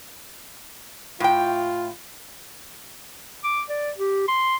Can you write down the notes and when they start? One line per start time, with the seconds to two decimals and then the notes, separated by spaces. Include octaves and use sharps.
1.20 A2 F4 G5
3.44 D6
3.69 D5
3.98 G4
4.28 C6